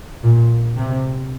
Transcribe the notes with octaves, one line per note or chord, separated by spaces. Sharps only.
A#2
C3